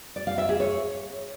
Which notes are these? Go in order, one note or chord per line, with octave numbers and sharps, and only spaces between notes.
D5
F5
E5
G#4
C#5